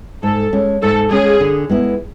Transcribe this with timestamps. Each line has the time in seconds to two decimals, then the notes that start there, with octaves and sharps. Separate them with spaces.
0.22 G#2 A4
0.53 G#3 C#4
0.82 G#2 A4
1.11 G#3 C#4 G#4
1.40 D3
1.69 G#3 B3 E4